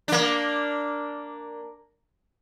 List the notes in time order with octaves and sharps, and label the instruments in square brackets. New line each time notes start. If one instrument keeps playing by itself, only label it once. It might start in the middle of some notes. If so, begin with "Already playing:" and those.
[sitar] A#3 D4